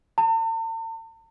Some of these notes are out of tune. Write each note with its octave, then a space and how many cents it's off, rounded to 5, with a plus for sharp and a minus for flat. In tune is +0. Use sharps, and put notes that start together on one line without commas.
A5 +45